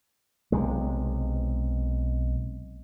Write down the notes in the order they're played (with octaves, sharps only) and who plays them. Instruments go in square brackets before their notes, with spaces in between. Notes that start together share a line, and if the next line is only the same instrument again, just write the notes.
[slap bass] B1 C3 G#3